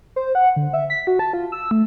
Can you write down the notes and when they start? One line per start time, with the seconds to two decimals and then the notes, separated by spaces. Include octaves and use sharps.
0.16 C5
0.35 F#5
0.56 D3
0.73 E5
0.90 B6
1.07 F#4
1.19 A5
1.33 F4
1.52 E6
1.71 A3